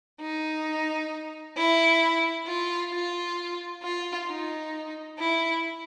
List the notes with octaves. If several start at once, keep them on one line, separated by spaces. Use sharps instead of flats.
D#4
E4
F4
F4
F4
D#4
E4